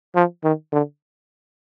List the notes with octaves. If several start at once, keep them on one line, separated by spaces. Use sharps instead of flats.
F3
D#3
D3